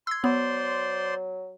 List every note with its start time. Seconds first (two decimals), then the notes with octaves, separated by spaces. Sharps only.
0.07 C6 E6 G#6
0.24 F#3 B3 C5 D5 C6